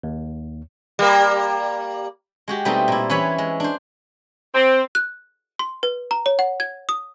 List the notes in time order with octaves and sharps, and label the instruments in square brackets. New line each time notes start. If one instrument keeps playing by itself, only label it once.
[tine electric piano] D#2
[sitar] G3 A#3
[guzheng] G#3 F#4 G4
B2 G3 A3 C4 D#4
A#2 E4
E3 C#4 E4 B4 C#5 B5
G#3
D4 C5
[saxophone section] C4
[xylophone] F#6
C6
B4
A#5
C#5
F#5
G#6
D#6